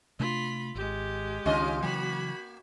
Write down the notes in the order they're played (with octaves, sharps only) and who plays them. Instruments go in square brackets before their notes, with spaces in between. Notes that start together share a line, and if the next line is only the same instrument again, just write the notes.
[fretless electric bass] C3 A3 D4 [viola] F4 B5
[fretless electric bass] G#1 [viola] G#3 G4
[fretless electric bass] C#2 D#3 D4 [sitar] C#4 F4 D#5
[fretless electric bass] C#3 E3 F#3 [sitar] A#3 [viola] F#4 B5